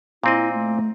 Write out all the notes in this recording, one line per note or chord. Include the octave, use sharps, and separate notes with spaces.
A#2 C4 E4 D#5
A3